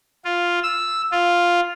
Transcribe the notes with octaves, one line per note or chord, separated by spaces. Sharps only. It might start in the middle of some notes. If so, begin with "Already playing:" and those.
F4
E6
F4